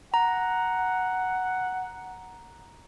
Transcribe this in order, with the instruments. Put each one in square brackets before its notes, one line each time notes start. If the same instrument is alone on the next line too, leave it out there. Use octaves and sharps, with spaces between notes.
[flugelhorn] F#5 [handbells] A#5